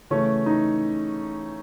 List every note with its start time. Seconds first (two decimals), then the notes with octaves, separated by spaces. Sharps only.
0.10 C#3 E3 A3 C#4
0.46 D#4